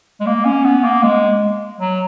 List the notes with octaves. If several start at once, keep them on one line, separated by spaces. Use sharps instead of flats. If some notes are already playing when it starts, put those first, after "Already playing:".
G#3
A#3
C#4
B3
A#3
G#3
F#3